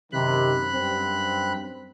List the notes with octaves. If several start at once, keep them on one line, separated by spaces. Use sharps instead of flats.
F#2 C3 D#3 B5 F#6
G2 C4